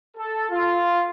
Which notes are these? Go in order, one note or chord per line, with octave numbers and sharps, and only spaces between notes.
A4
F4